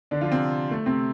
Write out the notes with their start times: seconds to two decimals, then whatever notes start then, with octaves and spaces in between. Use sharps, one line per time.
0.11 D3 D4
0.21 F3 F4
0.31 C3 C4
0.71 A3
0.86 C3 C4